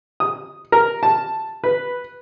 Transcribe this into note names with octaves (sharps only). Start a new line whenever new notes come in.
D#6
A#4
A5
B4